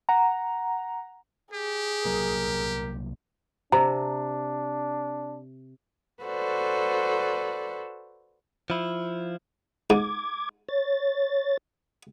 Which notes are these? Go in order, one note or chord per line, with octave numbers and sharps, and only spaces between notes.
F#5 A#5
G4 G#4
C2 F#3 A#3 A#4
C3 D4 A#5
F#4 A4 B4 C5 D5
F3 E4 F4
G#2 D6 G#6
C#5 A6